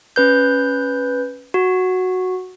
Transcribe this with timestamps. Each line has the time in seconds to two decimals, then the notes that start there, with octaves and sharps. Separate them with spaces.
0.16 C#4 B4 G6
1.54 F#4